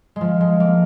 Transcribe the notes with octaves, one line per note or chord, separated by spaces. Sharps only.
G#3
F3
G#3
A#3